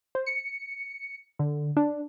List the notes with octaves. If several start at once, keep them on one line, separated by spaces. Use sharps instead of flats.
C5
C#7
D3
D4